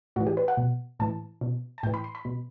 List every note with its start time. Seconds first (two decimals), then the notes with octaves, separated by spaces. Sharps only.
0.16 A2 F#4
0.20 E3
0.27 G4
0.37 B4
0.48 F#5
0.57 B2
0.99 A2 E3 A5
1.41 B2
1.78 A5
1.83 A2 G5
1.87 E3
1.94 B5
2.04 C6
2.15 B5
2.25 B2